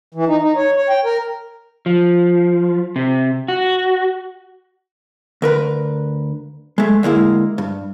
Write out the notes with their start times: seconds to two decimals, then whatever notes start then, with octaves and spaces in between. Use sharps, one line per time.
0.15 E3
0.28 D#4
0.41 D#4
0.56 C#5
0.77 C#5
0.89 G5
1.05 A#4
1.86 F3
2.96 C3
3.48 F#4
5.42 D2 A#4 B4
6.78 G#3 A3
7.03 D2 G#3 A#3 E4
7.58 G2